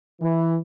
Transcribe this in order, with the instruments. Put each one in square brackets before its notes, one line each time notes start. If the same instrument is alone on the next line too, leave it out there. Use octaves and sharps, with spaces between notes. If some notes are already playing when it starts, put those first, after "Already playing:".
[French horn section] E3